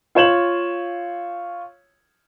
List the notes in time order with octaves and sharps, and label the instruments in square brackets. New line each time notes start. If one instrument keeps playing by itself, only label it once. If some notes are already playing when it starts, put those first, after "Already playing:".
[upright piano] F4 C#5 E7 F#7